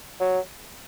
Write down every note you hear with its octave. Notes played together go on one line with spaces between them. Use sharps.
F#3